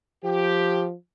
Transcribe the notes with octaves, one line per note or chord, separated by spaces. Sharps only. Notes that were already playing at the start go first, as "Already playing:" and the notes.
F3 G4